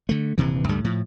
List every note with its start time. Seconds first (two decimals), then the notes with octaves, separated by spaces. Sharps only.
0.09 D3 A3
0.38 D#1 G2 C3 E3
0.69 C#2 G2 G3 A3
0.85 A2 F3